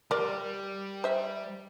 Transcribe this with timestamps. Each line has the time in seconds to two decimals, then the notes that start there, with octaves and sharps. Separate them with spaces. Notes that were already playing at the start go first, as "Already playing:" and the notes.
0.11 G3 A#4 D5
1.04 C5 E5